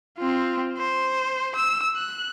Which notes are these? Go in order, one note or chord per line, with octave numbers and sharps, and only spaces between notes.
C4 F4
C5
E6
F#6